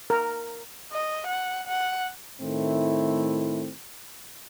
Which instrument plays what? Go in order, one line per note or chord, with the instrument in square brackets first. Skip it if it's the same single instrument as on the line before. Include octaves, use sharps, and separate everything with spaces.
[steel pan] A#4
[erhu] D#5
F#5
F#5
[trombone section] A2 D#3 A3 C4 E4